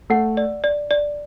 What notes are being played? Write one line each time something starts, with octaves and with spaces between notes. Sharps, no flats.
A3 F#5
D5
D5
D5